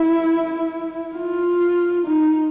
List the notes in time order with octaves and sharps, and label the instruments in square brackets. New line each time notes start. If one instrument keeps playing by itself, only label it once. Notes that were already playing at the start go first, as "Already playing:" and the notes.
Already playing: [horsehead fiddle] E4
F4
D#4